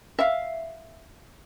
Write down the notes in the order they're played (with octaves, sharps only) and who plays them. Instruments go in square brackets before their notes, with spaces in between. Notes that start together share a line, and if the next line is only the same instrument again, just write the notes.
[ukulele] E5 F5